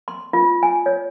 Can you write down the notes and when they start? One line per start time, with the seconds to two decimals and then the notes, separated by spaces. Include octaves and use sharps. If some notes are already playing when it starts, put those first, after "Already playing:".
0.08 C6
0.33 F4
0.63 G#5
0.86 C#5